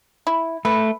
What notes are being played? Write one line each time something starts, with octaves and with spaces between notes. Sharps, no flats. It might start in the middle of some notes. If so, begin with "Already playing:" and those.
E4
A3 B4